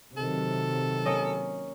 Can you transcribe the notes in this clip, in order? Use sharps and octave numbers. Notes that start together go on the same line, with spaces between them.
C3 D#3 F#3 A4
A#3 C#4 D#5